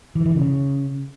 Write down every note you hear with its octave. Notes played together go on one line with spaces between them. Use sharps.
E3
E3
C#3